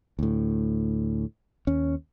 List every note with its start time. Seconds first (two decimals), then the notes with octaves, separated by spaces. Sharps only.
0.19 D2 A2
1.67 D#2 C#4